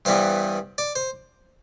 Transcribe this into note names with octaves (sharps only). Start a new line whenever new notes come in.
G2 E3 G3 B3 C5
D5
C5